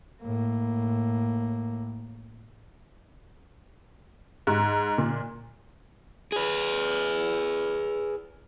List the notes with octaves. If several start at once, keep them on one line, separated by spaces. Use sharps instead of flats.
A2 A#3
G#2
A#2
G#4 B4